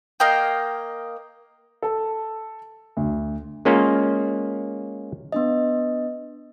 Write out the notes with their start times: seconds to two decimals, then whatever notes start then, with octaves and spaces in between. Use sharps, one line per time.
0.20 A#3 D#5 F5 G5
1.82 A4
2.97 D2
3.65 G#3 A#3 C#4 F4
5.32 B3 D4 D#5